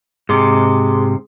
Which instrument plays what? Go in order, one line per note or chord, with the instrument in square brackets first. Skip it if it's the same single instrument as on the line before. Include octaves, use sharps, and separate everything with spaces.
[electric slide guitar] G#2 C3 [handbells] G#4 C6 D6